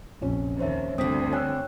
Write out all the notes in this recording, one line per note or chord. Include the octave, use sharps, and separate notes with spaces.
A#1 F2 C3 C#4
D#2 C5 C#5 E5
D2 G2 D3 C4 D#6 B6
C#5 G5 G#5 E6 F#6